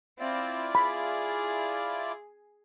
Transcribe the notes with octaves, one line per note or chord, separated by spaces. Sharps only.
C4 E4 F4 D5
G#4 B5